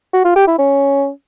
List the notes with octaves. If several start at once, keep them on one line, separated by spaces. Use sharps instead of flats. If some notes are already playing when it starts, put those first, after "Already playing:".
F#4
F4
G4
E4
C#4